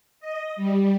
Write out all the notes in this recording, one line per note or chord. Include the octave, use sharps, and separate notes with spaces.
D#5
G3